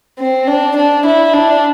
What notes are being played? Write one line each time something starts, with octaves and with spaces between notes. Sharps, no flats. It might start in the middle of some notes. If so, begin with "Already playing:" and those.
C4
D4
D4
E4
D4